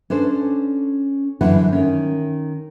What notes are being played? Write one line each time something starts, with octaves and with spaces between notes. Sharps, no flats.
C#4 D4 A4 C5
F#2 D3 E3 C5 F#5
D#3 C#4